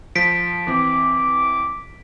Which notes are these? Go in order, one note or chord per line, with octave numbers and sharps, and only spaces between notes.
F3 B6 D7
E3 C4 D6